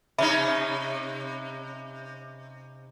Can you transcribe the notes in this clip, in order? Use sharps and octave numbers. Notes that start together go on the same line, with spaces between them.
C3 C#4 D#4 E5 B5